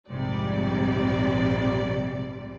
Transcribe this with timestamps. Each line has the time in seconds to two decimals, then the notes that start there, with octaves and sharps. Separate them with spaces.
0.10 A#1 F2 G#2 C3 G3 D5